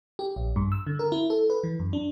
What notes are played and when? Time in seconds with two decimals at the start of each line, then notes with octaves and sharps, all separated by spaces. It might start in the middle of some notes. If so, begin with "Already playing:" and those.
0.19 G4
0.36 A#1
0.56 G2
0.72 E6
0.87 D3
0.99 A#4
1.12 E4
1.30 A4
1.50 B4
1.64 E3
1.80 F#2
1.93 D4